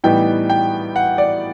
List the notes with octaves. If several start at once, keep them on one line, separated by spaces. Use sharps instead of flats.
A2 E3 G3 B3 D#4 G5
G5
F#5
D5